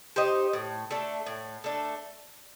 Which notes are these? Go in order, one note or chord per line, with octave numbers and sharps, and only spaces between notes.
D#4 G4 C5
A2
A3 D4 A4
A2
A3 D4 A4